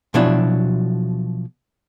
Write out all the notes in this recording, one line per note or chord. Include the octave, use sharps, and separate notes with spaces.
B2 F3 F#3 D4 E4